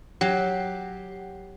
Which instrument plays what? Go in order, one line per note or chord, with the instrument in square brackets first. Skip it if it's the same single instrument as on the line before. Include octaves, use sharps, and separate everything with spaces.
[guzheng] F#3 [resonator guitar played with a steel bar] G4 [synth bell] F#5 C7